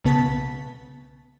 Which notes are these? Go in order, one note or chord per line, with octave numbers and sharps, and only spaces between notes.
B1 C#3 B3 A5 B6